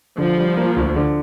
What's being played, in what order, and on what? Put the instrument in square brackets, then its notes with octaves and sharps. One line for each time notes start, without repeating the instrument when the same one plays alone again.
[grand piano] D3 [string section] F3
[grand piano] G3
A#3
D2
D3